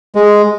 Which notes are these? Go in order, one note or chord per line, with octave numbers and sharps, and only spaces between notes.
G#3